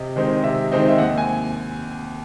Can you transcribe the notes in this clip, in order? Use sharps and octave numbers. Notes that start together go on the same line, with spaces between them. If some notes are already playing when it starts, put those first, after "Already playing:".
Already playing: C3 D#5
D#3 G#3 C4 D#4
C3 E5
D#3 G#3 C4 D#4
E5
D#2 F#5
G#5